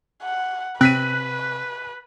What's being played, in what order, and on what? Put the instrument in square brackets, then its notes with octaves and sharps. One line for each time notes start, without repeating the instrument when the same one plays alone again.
[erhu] F#5
[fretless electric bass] C3 [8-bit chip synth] C4 [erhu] B4 [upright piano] F#6 B6 D#7